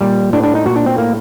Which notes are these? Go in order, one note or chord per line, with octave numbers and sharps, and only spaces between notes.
A#2 G3
A2 D4
D4
D#4
A#2 F#4
D4
C4
A2 A#3